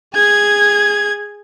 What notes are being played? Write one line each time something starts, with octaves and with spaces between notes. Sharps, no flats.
G#4 G#6